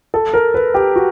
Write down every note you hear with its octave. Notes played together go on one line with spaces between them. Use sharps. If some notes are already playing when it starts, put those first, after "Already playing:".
A4
A#4
B4
G4
F#4